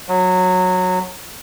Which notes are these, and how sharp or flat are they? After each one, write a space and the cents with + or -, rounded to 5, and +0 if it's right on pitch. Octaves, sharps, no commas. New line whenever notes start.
F#3 -15